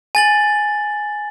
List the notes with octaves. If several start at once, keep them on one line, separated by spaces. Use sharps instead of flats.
G#5 A6 F#7